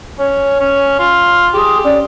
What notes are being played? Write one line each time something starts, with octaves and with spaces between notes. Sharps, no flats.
C#4 C#5
C#4
F4
G4 G#4 C6
C#4 D5